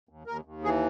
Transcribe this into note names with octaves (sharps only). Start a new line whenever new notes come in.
D#2
D#2 A#4
D#2
E3 G#4